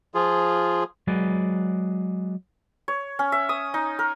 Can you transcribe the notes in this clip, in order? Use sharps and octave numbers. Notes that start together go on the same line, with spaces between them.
F3 F4 G#4
F#3 G#3 G#4 B4 D5
C#5
C#4
E5
D#6
D#4
A#4